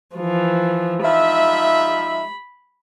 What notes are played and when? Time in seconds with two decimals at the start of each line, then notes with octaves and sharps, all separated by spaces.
0.15 E3 F3
1.05 F3 D#4 E5 B5